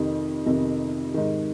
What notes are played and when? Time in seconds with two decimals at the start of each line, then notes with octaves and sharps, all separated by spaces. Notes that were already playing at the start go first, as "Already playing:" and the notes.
Already playing: F2 C3 D#3 G4
0.46 F2 C3 D#3
1.14 G#2 D#3